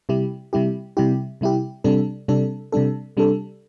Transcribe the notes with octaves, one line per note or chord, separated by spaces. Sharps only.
C3 G3 E4 G4
C3 G3 E4 G4
C3 G3 E4 G4
C3 G3 E4 G4
C3 G3 D4 A4
C3 G3 D4 A4
C3 G3 D4 A4
C3 G3 D4 A4